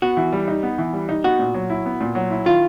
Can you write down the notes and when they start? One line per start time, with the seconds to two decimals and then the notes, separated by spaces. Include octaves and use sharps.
0.02 B3 F#4
0.17 E3
0.32 G3
0.48 D#4
0.63 B3
0.78 E3
0.93 G3
1.09 D#4
1.24 B3 F#4
1.39 A#2
1.54 F#3
1.70 E4
1.86 B3
2.01 A#2
2.15 F#3
2.31 E4
2.46 D#3 F4